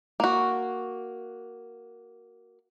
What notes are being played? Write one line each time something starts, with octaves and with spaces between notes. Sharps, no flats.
A#3 F#4